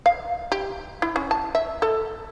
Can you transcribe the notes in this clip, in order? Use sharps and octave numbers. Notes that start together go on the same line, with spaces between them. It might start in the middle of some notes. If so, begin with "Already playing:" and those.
F5
G4
E4
C#4
A5
E5
A4